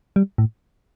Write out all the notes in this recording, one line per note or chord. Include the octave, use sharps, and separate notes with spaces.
G3
A2